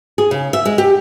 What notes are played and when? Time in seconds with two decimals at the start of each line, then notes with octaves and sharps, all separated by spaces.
0.18 G#4
0.31 C#3
0.53 E5
0.65 G#3
0.78 G4